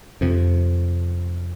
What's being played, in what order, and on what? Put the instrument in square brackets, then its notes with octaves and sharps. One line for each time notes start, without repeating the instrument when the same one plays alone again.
[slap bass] F2 C3